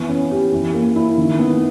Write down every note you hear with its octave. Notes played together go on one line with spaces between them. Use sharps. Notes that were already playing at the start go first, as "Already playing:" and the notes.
Already playing: E3 B3
C#4
G4
E3
A#3
E4
D#3
B3